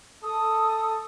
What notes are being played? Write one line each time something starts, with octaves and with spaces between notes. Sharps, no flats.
A4 D#6